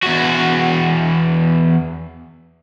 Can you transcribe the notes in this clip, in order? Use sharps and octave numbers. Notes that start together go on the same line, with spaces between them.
E2 F#4